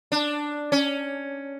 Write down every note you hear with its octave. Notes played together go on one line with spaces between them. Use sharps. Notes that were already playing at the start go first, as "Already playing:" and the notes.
D4
C#4